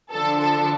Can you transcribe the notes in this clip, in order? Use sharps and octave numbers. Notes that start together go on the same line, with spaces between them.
D3 F3 D4 A4
A4